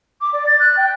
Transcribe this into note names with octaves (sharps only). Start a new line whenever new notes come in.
D6
D5
A6
F#6
G5